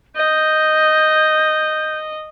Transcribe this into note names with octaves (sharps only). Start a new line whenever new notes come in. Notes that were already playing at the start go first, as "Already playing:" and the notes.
D#5 G6